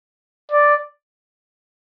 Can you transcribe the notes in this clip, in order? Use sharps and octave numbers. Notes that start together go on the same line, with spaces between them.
D5